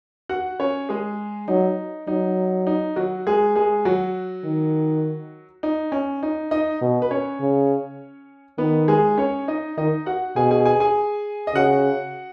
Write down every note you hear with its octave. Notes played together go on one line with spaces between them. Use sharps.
F#4 F#5
C#4 C#5
G#3 G#4
F#3 D#4
F#3 D#4
D#4
F#3 F#4
G#3 G#4
G#3 G#4
F#3 F#4
D#3
D#4
C#4
D#4
D#4 D#5
B2
B4
C#4 C#5
C#3
D#3 B3 B4
G#3 G#4
C#4 C#5
D#4 D#5
D#3 D#4 D#5
F#4 F#5
B2 G#4 G#5
G#4 G#5
G#4 G#5
G#4 G#5
D#5
C#3 F#4 F#5